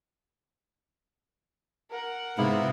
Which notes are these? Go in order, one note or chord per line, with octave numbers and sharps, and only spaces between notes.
A#4 F#5
G#2 C3 A#3 B3 E4